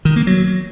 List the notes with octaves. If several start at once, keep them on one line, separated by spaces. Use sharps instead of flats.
D#3
A#3
F#3